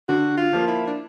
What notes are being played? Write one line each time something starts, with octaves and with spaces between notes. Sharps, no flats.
D3 F#4
F4
F3 A#3
E4
D4